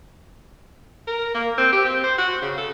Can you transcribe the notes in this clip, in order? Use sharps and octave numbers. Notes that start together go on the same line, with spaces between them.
A#4
A#3
C4
G4
C4
C5
F#4
C#3
A4